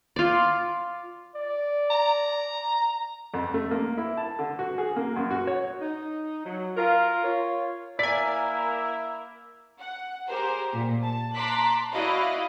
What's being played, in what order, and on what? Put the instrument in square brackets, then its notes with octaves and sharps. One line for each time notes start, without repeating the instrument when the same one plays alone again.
[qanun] F4 D5
[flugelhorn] D5
[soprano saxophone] A#5
[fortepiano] F2
A3
A#3
E4
A5
D3
F#4
G#4
A#3
F#2
F#4
C#5
[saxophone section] D#4
F#3
F4 A#4
F4 C#5
[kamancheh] A#3 A#4 [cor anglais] E4 [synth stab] D5 G#5 [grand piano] B6
[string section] F#5
G4 G#4 A#4 C5
A#2
A5
A5 A#5 C6 D6 F#6 B6
E4 F#4 D5 D#5 F5 B5